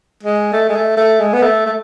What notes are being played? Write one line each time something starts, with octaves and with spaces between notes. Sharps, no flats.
G#3
A3
G#3
A3
A3
G#3
B3
A3
A3